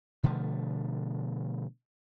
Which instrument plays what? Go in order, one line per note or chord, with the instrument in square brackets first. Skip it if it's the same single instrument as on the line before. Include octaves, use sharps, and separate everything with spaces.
[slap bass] B2 D3 F3 A3